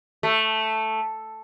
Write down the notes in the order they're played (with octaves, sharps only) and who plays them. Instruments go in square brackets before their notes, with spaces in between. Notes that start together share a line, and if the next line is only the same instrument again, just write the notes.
[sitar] A3